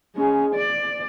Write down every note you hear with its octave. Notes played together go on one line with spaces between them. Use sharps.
G#3 C#4
D5